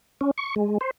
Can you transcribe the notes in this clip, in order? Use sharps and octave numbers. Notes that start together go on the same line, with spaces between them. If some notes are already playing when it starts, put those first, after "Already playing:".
C#4
C#6
G#3
C5